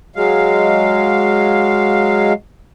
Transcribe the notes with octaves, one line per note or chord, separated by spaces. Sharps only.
F#3 G#3 F5